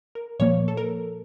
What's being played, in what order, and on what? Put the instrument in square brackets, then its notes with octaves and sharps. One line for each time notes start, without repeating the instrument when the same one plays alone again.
[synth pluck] A#4
A#2 F3 A#3 C#5
A4
A#4